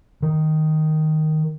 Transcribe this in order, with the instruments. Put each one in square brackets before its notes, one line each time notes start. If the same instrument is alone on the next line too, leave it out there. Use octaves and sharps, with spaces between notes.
[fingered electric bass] D#3